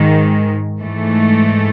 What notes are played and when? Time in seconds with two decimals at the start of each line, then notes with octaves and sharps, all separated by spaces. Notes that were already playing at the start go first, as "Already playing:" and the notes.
Already playing: G#2 D#3 G#3
0.82 G#2 E3 A3